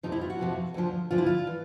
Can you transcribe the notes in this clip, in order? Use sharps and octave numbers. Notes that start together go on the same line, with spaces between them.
F2 C3 F3 D#4
E4
F4
F#4
F2 C3 F3
D2 D3 F3
D2 D3 F3 F4
E4
F4
E3